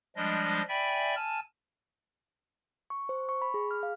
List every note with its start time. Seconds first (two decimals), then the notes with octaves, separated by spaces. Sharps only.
0.16 F3 G3 G#3 D4 D#5
0.69 D5 E5 G5 G#5 B5
1.16 G#5 A5 E6 F6
2.90 C#6
3.09 C5
3.29 C#6
3.42 B5
3.54 G#4
3.71 F6
3.83 F5